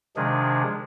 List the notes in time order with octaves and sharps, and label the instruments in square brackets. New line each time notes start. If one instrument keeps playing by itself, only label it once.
[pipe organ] C3 D#3 F3 G#3 D4 G#4